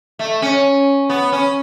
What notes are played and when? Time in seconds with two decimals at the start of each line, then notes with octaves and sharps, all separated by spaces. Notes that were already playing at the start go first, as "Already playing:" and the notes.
0.19 A3
0.42 C#4
1.09 B3
1.32 C#4